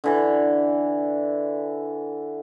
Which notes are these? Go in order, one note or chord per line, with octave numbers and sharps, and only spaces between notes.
D3 E3